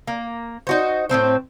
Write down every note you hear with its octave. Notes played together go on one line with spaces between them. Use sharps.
A#3
D#4 F#4 C5
A2 C3 C4 C5